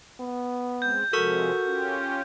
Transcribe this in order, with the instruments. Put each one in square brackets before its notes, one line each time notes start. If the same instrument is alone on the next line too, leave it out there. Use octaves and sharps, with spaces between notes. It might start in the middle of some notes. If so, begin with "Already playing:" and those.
[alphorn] B3
[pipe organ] G#3 C4 [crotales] G6
[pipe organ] C3 F3 G#3 [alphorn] F#4 [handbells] A4 A#4 C#6
[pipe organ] C#4 F4 G4